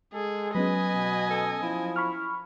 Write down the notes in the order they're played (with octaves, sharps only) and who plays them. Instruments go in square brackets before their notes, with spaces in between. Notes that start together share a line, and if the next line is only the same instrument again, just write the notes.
[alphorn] G#3 [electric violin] G#4 [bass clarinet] A4
[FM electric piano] F#3 B3 C#4 [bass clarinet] B4 [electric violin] D#5 G#5
[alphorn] B2
[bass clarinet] A4
[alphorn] F3 [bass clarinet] E4
[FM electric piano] B5 C#6 F6